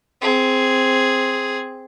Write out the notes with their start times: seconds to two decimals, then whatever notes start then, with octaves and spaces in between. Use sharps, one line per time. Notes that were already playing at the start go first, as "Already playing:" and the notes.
0.22 C4 G#4